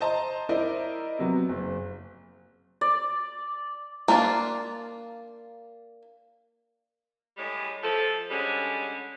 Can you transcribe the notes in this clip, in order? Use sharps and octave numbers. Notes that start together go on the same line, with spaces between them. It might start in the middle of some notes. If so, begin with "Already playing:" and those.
C5 D#5 A5 A#5 C6
E4 A#4 C5 D5 D#5
C3 F#3 B3
F#1
D5
A#3 D4 F4 D5
A2 G3 G#3
F3 A4
D3 G3 G#3 C#4